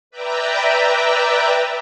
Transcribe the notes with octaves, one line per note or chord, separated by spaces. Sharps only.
B4 D5 E5 G5 A#5